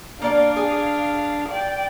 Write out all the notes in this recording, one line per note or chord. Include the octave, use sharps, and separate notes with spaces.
A#3 D4 D5 F5
G#4
D5 G5